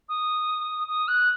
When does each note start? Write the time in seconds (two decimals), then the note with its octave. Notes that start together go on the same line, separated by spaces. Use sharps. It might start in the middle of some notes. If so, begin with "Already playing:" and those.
0.08 D#6
0.87 D#6
1.07 F#6